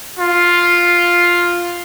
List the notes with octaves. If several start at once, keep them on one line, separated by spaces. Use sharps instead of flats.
F4